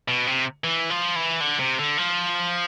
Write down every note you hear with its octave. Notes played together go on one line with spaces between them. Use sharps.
B2
C3
E3
F3
E3
D3
C3
D3
F3